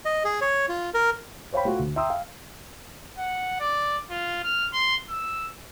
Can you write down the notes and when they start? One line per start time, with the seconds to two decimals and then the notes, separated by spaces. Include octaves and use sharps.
0.05 D#5
0.25 G#4
0.41 C#5
0.69 F4
0.94 A#4
1.53 C5 C#5 F5 G5 B5
1.65 A3 F4 F#4
1.79 D2
1.96 E5 G5 A#5 C6 D#6 E6
2.10 F5
3.18 F#5
3.60 D5
4.10 F4
4.44 F6
4.73 C6
5.10 E6